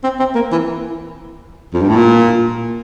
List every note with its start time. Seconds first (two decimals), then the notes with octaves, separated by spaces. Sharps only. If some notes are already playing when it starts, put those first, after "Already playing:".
0.03 C4
0.19 C4
0.35 A#3
0.52 E3
1.74 F2
1.82 G2
1.89 A2
1.96 A#2